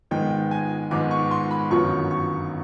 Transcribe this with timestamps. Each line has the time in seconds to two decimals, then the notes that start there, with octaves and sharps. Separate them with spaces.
0.11 G#2 D#3 G#3 B3 G5
0.51 G#5
0.91 G#2 D#3 G#3 B3 D6
1.11 C#6
1.31 C6
1.51 B5
1.71 G1 F#2 D#3 F#3 B3 C#6
2.11 C#6